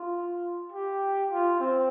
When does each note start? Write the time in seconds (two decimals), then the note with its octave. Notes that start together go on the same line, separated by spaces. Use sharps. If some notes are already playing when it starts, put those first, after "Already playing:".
Already playing: F4
0.72 G4
1.31 F4
1.60 C4